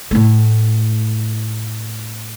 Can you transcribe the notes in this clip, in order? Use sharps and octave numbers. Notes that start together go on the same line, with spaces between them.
A2 A3